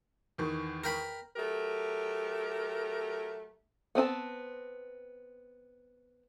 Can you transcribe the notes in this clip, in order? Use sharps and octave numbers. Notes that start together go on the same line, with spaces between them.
E2 D#3 C#6
A#4 G5 B5
F#3 A3 G4 A#4
B3 C4 G#5 A5